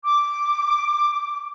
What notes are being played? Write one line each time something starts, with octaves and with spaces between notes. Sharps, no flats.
D6